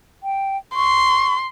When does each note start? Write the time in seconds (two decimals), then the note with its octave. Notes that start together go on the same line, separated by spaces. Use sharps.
0.23 G5
0.75 C6 C#6